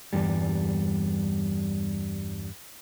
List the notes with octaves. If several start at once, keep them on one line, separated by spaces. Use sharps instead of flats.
E2 G2 G3